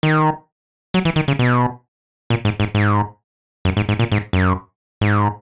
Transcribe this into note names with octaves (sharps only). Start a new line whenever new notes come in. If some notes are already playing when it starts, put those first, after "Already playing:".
D#3
F#3
E3
D#3
C#3
B2
A#2
G#2
G#2
G#2
F#2
G#2
G#2
A#2
G#2
F#2
G#2